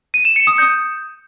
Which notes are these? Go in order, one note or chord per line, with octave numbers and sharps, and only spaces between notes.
D#7
E7
C#7
D#6
G6